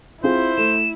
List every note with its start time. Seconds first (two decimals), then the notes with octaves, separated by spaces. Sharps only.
0.24 C4 E4 F4 G#4 C5
0.58 A3 E7